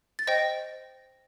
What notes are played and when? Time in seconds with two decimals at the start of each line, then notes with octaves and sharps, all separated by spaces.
0.19 A6
0.27 C5 D#5 G5 A#6